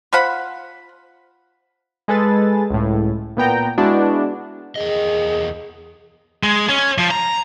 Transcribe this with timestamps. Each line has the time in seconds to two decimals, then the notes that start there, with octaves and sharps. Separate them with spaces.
0.13 F4 C5 F#5 B5
2.08 G#3 G#4 A4 B4 A6
2.70 C#2 A2
3.37 A#2 B3 G5 A#5
3.78 G#3 B3 D4 E4 F#4
4.76 E2 G#4 A#4 D#5
6.43 G#3
6.69 C#4
6.98 F3
7.11 A#5